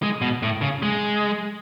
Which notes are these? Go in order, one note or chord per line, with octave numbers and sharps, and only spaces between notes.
G#3
B2
A2
C#3
G#3